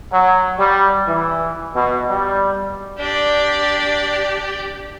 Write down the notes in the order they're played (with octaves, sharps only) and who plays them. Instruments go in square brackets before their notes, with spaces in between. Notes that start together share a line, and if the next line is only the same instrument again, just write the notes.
[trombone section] F#3
G3
E3
B2
G3
[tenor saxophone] D4 [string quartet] G4 D5